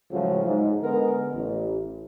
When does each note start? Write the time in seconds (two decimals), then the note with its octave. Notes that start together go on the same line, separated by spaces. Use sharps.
0.11 C#2 A2 C#3 F3 F#3
0.45 G#2
0.82 D3 G#3 B3 A#4
1.34 A1